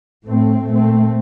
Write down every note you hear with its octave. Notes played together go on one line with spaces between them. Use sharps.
A2 A3 C4
A#2 A3 C4